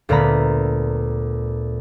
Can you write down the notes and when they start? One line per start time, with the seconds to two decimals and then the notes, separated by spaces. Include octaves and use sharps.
0.09 D2 A#2 D3 B3 A#5 B5